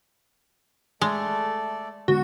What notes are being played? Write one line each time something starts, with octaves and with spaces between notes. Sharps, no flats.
G#3 A3 A4 D5
D3 G#3 B3 F#4